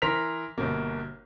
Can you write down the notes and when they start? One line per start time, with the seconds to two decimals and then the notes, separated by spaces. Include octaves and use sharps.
0.02 E3 A#4 C6 B6 F7
0.58 G1 B2 A#3